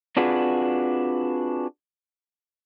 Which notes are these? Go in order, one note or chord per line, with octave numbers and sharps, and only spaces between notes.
C4 D4 F4 F#4 G#4 B4